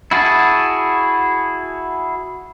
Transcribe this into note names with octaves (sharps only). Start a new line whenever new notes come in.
E4 F#4 G#4 A5